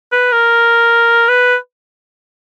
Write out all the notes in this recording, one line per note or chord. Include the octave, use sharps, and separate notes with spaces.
B4
A#4
B4